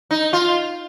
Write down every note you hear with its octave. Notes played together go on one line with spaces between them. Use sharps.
D#4
F4